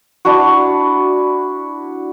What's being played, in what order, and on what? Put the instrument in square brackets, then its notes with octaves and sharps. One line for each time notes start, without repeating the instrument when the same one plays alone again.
[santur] D4 E4 F#4